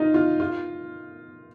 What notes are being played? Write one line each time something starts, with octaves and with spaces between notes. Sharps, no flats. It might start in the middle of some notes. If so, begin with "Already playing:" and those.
Already playing: D#4 F4
F4
F4